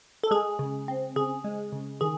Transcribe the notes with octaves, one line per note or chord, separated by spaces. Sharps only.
A4
G#3 G#4
C#3
C4
C#3 G#4
G#3
C#3
D#3 G#4